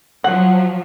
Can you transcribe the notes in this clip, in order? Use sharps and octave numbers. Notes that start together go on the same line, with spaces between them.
F3 F#3 F#5